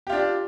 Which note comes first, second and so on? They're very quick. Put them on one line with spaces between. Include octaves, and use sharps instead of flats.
G4 F4 D4